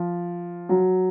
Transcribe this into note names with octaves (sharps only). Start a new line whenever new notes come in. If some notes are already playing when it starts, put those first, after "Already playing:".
Already playing: F3
F#3